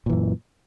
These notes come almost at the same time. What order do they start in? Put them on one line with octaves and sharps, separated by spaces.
A#2 E3 F#2